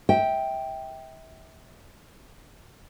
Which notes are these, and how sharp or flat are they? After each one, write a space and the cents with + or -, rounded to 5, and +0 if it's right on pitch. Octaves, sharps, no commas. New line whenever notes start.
E5 -30 G5 +0